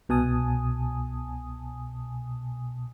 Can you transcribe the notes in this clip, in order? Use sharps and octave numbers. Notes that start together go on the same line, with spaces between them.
C2 B2 G#5 A5 D#6